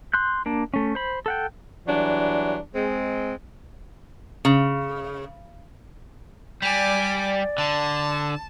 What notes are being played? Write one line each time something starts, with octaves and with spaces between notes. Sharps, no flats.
C6 F#6 G6
A#3 D4
A3 C#4
C5 B5
A4 F#5 G5
E3 F#3 G3 D4
G#3 C4
C#3
G3 D5 G#5 D6
D3 A5